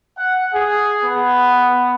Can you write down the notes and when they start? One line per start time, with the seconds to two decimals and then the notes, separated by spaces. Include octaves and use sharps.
0.17 F#5
0.54 G#4
1.04 B3